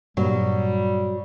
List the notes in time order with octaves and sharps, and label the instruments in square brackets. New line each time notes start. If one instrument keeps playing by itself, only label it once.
[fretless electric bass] G2 A#2 [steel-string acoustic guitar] F#3 [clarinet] G3